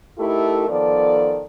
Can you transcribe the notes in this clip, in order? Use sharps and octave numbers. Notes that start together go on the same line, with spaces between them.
A3 D#4 E4 G4 A4 A#4
D#3 F3 B3 A4 D5